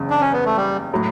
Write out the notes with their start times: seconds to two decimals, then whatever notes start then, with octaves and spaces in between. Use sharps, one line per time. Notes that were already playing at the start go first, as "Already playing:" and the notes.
Already playing: F#1 E2 C#3
0.10 D4
0.21 C#4
0.33 B3
0.45 A3
0.56 G3
0.93 A2 F#3